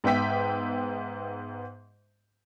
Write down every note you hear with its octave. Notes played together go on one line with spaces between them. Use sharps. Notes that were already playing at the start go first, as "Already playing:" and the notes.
G#2 B3 E5 G5 B6